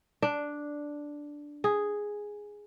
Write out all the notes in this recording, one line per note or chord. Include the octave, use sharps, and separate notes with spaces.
D4
G#4